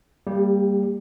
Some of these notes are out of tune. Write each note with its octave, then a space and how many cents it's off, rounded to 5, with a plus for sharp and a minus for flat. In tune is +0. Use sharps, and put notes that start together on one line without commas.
G3 +0 A#3 -20 G4 +35